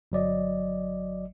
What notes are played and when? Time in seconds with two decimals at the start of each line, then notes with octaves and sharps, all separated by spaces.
0.12 G1 F#3 D5 D#5